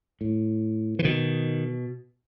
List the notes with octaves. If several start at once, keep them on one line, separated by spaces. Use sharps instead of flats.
A2
E3
B2 D#3